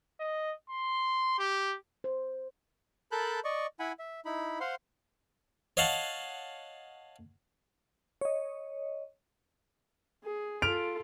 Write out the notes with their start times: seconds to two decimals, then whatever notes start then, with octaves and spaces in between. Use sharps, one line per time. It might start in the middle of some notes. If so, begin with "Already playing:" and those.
0.20 D#5
0.70 C6
1.39 G4
2.04 C5
3.12 A4 A#4 A5 B5 F#6 G6
3.44 D5 D#5 C#6
3.80 E4 F#5 G#5 B5
3.99 E5
4.25 D#4 E4 B5
4.60 C5 F5 F#5 C6
5.77 C#5 D#5 F5 F#5 A5
8.21 C#5 D#5
10.24 G#4
10.62 F4 A4 F6 D7 F7